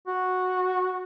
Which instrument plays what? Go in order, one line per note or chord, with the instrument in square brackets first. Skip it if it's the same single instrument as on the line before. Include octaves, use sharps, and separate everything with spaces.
[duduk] F#4